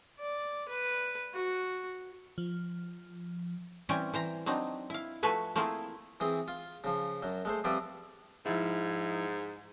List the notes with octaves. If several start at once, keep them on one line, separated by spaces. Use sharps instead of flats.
D5
B4
F#4
F3
E3 G3 C4 C#4 G5 G#5
E3 C5 A#5
F#3 C4 D4 D#4
E4 F5
F3 A3 F#4 A4 B4 G#5
A3 A#3 C4 E4 F4 G#4
E3 C4 G#4
F4
C#3 F3
F#2 F#3
G#3 A3 C5
F3 G3 C4 B4 D5 E5
G#2 F3 E4